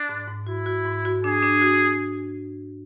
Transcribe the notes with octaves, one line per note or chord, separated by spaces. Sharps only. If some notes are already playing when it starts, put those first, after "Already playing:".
Already playing: D4
G#2
G#2
E4 F#4
F#4
G#2
F#4
D4 G#4
D4
F#4